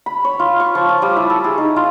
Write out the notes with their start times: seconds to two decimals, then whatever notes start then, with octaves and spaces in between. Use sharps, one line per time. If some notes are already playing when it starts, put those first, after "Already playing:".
0.06 B5
0.24 C#5
0.39 F4
0.60 C#6
0.75 F3
0.89 D#6
1.02 G3
1.16 E4
1.30 A4
1.44 G#4
1.58 D#4
1.76 F4